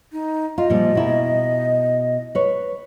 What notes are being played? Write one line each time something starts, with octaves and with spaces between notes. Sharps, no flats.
D#4
F4 D#5
A#2 F3 G3
B2 E4 A#4
B4 C#5